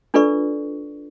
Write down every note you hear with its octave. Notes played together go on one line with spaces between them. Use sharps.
D4 F4 A4 B4 D5 C#6